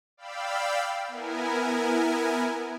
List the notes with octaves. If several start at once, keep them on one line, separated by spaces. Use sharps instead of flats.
D5 F5 G5 B5 E6
B3 E4 A#4 G#5